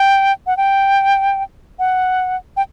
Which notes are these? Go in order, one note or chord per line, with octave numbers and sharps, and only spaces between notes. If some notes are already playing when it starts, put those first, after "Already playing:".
Already playing: G5
F#5
G5
F#5
G5